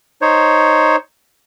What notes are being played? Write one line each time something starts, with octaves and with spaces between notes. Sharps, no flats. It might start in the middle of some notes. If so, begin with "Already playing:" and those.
D#4 C5 C#5